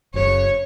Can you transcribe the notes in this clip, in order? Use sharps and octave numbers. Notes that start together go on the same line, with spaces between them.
F#1 F#2 C#3 C#5